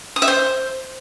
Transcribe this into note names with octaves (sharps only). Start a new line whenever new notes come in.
D#6
E5
C5